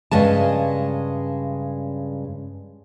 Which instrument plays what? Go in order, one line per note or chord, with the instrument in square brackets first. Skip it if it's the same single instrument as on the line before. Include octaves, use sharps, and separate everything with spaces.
[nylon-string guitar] G2 C#3 G#3 A5